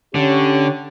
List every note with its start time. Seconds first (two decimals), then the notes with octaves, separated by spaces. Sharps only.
0.15 D3 C#4 G4 C#5